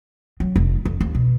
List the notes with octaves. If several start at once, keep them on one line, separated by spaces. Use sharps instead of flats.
F#3
F1
F2
D#2
B2